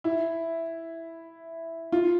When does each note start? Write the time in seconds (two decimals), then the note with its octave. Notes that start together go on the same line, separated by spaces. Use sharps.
0.04 E4
1.92 F4